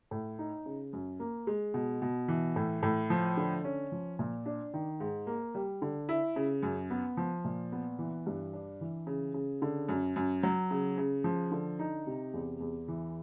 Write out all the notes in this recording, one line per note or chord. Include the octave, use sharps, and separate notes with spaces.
A2
D#4
C#3
F#2
A#3
G#3
B2
B2
E3
A2
A2
F3
D3
C#4
F3
A#2
D4
D#3
G#2
A#3
G3
D3
E4
C#3
F#2
B3
F3
A#2
B3
E3
G2
D4
E3
C#3
C#3
D3
F#2
F#2
F#3
C#3
C#3
F3
D3
D#4
C3
E2
E2
E3